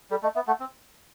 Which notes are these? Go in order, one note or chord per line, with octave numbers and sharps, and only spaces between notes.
G3 A4
A3 D#5
B3 E5
A3 F#5
C4